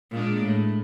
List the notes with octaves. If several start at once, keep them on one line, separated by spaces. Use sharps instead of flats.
A#2 G#3 D4
A2